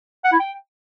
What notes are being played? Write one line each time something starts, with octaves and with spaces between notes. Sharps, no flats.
F#5
E4
G5